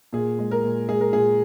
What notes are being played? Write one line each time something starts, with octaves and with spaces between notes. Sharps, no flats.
A#2 G#4
G#3
A#4
A#2
G#3 G#4
A#4
A#2 G#4